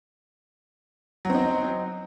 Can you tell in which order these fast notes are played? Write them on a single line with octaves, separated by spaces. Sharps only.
F#3 C4 D#4